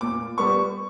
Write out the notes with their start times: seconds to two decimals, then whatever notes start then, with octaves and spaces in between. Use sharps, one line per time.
0.01 A#2 D6
0.38 G3 B3 C#6